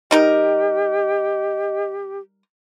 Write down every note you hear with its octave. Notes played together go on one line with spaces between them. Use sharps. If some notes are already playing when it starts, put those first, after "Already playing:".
G3 D#4 G4 A#4 D#5